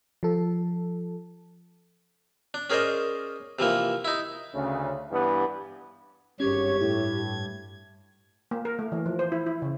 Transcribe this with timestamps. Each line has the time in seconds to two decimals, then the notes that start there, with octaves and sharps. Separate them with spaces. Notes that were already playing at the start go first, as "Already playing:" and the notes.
0.23 F3 A4
2.54 D4
2.70 C#4 G#4 A#4 C5 D5 D#5
3.59 C3 E3 F3 A#3
4.05 D#4 E4
4.53 D2 C#3
5.11 G2 E3 B3
6.40 G#1 G2 C#4 G4 C#5 G#6
6.81 A2 E4
8.51 A#3
8.65 A#4
8.79 A3
8.92 E3
9.06 F3
9.19 C5
9.32 E4
9.46 E4
9.62 C#3